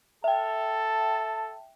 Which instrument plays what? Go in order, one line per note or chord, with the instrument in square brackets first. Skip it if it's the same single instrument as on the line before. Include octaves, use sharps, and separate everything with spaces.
[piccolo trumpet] A4 [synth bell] E5 G5 [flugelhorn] A5